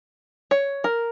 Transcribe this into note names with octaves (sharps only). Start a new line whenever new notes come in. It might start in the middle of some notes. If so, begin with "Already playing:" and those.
C#5
A#4